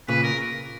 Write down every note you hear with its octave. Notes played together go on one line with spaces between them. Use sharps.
A#2 C#3 B4
A#4